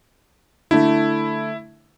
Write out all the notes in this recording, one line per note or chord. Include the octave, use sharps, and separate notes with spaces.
D3 A3 E4 E5